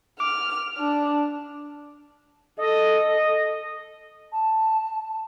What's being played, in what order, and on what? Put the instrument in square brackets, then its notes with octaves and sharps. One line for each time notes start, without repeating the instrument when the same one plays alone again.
[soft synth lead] D6 [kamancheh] F6
[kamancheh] D4
[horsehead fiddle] A4 [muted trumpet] D#5
[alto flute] A5